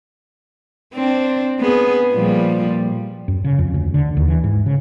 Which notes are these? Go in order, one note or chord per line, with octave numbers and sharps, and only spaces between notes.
C4 D4
B3 G#4
A#2 F3 G3
F#2
C#3
F2
D2
D3
D#2
E3
G#2
C#3